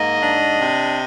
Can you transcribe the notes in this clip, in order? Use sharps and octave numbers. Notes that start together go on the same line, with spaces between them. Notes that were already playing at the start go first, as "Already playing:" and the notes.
Already playing: G#2 A#3 D#5
D4
C3